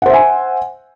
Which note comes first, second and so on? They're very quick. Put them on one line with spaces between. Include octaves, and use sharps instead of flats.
F#5 C5 E5 G#5